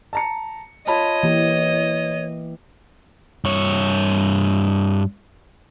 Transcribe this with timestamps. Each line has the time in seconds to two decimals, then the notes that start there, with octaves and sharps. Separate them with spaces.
0.13 A5 A#5 C#7
0.87 F4 C#5 D#5 A5 B5
1.23 E3 A#3 G4
3.45 G2 C#5